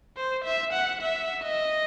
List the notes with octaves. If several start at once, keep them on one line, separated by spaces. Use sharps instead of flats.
C5
E5
F#5
E5
D#5